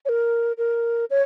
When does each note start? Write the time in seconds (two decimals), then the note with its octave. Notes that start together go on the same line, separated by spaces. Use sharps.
0.05 C#5
0.09 A#4
0.58 A#4
1.10 C#5